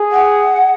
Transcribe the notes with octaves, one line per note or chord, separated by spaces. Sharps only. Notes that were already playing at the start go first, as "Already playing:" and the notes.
Already playing: G#4
F#5